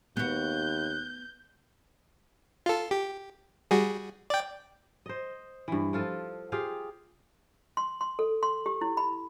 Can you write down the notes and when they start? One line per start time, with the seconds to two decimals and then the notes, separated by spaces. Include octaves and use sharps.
0.17 D#2 B3 F#4 F#6 G6
2.66 F4 A4
2.91 G4
3.71 G3 F#4 G#4
4.30 D5 G5
5.06 C5 D#5
5.68 G2 E3
5.93 F3 F4 A4
6.52 F4 G4 G#4 F5
7.77 C6
8.01 C6
8.19 A4
8.43 C6
8.66 G4
8.81 E4
8.97 B5